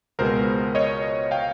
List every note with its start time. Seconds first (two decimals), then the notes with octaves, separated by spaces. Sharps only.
0.19 C#2 B2 G#3 B3 A#4 C5
0.75 C#5 D#5
1.31 F5 G5